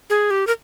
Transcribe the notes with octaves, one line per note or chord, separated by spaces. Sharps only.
G#4
G4
A#4